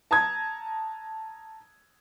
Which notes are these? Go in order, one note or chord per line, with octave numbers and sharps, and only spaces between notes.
A5 A#5 D#6 G#6